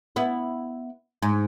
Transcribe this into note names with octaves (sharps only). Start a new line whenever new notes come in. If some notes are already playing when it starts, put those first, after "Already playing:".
B3 E4
G#2